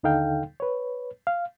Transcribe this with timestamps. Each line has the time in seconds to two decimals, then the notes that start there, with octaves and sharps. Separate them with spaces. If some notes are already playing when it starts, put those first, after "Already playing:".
0.03 D#2 D3 D#4 A4 F5 G5
0.60 B4 C#5
1.27 F5